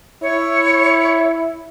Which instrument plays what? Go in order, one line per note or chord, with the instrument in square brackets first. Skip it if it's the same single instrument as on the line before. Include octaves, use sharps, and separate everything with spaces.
[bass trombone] E4 [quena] C#5